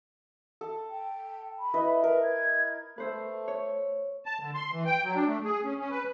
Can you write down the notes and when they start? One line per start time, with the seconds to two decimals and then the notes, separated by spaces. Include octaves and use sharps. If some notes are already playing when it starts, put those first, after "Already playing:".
0.61 A4
0.91 G5
1.59 B5
1.74 E4 B4 D#5
2.04 A#4 B4
2.24 G#6
2.98 A3 B4 C5 E5
3.48 C#5
4.26 A5
4.40 D3
4.55 C6
4.72 E3
4.86 G5
5.03 F#3
5.15 D4
5.27 A3
5.44 G#4
5.64 C#4
5.79 C#4
5.90 B4